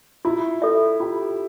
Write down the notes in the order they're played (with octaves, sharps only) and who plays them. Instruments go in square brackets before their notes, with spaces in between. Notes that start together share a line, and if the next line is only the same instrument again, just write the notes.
[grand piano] E4 [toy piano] F4
[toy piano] A4 E5
[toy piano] F4 [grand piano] G4